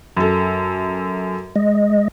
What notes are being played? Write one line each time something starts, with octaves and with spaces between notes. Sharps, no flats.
F#2 A4
G#3 D#5